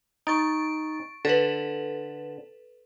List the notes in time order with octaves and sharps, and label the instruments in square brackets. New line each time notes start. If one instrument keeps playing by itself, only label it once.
[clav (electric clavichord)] D#4 [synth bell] C#6 A6 D7
[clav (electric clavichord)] D3 [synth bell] A4 B4